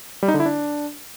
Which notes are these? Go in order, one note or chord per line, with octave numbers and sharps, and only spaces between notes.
G3
D#4
D3
E4
D4